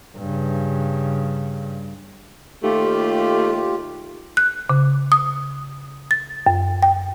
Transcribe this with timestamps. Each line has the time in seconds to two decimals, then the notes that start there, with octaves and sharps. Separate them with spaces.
0.18 G2 C#3
2.63 D#2 A3 F4 G4
4.37 F#6
4.70 C#3
5.12 D#6
6.11 A6
6.47 F#2
6.83 G5